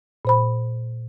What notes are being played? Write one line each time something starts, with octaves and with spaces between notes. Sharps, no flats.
A#2 C5 B5